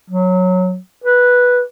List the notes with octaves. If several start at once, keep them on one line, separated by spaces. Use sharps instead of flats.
F#3
B4